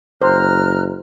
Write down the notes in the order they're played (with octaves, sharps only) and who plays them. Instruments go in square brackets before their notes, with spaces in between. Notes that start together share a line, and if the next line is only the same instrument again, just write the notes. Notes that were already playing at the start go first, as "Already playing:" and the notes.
[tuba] F#1 [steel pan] C5 [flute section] A#5 F6 F#6